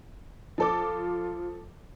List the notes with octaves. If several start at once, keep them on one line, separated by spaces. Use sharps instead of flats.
F3 F4 A4 D6